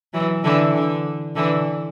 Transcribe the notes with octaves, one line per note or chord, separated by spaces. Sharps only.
E3 F#3
D3 E3
D3
D3 E3